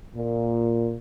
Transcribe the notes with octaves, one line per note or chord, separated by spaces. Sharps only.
A#2